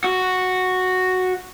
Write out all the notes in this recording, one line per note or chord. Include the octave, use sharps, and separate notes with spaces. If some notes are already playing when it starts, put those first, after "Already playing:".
F#4